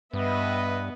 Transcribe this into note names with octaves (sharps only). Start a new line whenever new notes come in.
G2 B3 B4 D#5 E5